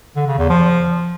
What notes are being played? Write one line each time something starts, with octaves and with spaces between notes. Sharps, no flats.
D3
C#3
E2
F3